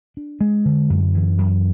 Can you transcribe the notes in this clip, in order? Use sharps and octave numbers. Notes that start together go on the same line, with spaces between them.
D4
G#3
D3
F#2
E3
F#2